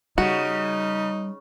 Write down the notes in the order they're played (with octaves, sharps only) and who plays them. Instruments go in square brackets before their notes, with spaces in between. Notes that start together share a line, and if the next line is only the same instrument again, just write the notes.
[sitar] C#3 [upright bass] G3 [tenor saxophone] D#4 [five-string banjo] F#4